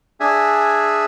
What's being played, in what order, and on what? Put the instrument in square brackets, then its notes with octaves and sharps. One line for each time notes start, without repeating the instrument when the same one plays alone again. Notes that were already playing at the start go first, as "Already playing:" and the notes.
[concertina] D4 G#4 E5 G#5